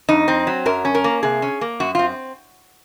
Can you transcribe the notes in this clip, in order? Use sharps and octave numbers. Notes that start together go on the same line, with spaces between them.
F2 D#4
C4
F#3
F#2 A#4
C#4
A#4
A#3
C3 G#4
C#4
A#3
F#2 F#4
C4 F4